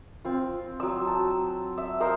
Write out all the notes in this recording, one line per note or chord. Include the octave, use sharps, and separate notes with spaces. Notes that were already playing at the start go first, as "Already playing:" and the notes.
C4 F4
F#3 E6
A5
E5
A#4 C5 D#5 F5